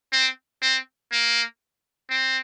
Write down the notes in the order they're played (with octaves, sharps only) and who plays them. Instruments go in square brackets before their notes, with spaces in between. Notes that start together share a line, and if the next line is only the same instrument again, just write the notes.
[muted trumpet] C4
C4
A#3
C4